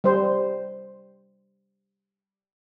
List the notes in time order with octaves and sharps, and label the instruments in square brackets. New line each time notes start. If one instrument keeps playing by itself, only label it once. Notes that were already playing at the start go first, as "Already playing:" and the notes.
[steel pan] G3 C5